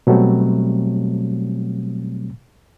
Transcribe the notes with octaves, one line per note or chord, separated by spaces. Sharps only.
B2 F#3 G3 A3 C4